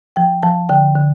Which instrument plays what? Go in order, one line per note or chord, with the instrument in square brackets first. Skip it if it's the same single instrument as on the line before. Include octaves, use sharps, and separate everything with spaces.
[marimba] F3 G5
F3 A5
D3 G5
D3